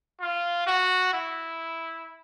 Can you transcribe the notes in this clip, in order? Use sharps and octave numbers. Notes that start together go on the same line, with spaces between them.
F4
F#4
E4